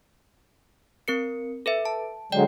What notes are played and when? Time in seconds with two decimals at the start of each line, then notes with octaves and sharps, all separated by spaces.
1.08 C4 A#4 C#7
1.66 A4 B4 E5
1.85 A5
2.32 D3 F#3 G#3 D5 G5